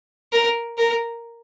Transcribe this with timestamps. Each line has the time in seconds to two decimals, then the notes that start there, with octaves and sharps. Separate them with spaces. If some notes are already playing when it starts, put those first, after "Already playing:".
0.32 A#4
0.78 A#4